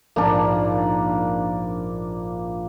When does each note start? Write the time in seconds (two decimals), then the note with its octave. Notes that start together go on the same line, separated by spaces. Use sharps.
0.16 A#1 G#2 A#3 D4